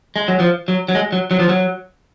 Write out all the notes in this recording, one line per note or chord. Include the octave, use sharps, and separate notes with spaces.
G#3
F#3
F3
F#3
F#3
G#3
F#3
F#3
F3
F#3